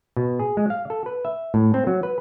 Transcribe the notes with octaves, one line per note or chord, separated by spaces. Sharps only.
B2
G#4
G#3
F5
A4
B4
E5
A2
C4
F#3
B4